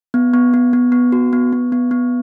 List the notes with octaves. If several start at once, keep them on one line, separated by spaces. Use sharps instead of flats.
B3
B3
B3
B3
B3
F#4
B3
B3
B3
B3